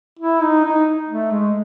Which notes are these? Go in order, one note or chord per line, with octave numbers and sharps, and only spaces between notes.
E4
D#4
D#4
A3
G#3